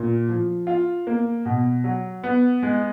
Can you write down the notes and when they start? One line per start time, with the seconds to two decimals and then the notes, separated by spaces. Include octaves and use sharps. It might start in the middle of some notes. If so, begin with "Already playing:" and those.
Already playing: A#2
0.29 F3
0.67 F4
1.07 A#3
1.45 B2
1.84 F#3
2.23 B3
2.63 G#3